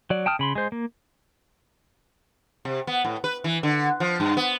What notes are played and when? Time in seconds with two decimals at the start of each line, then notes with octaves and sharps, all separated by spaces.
0.10 F#3 D5
0.26 G5 A5 D#6 F6
0.39 C#3 B5 C6
0.55 G#3 C5
0.72 A#3
2.65 C3
2.87 B3
3.05 A2
3.24 B4
3.44 E3
3.63 D3
4.00 F3
4.20 G2
4.37 B3